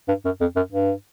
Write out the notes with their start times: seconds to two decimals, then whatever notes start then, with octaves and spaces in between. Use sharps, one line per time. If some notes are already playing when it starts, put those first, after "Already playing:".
0.08 G2
0.25 F#2
0.41 F2
0.56 F#2
0.72 G2